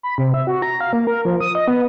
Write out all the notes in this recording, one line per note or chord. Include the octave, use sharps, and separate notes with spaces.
B5
C3
E5
F#4
A#5
F5
A#3
A#4
F3
D#6
D#5
B3